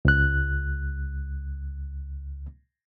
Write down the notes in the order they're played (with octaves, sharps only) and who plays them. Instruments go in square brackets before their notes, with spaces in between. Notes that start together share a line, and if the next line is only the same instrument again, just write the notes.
[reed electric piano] C#2 F#6